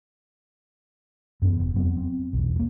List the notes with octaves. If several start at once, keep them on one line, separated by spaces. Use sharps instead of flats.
F#2 E3 B3
F1
F2 F#3 B3 C4
C4
B1 E2
F3 A#3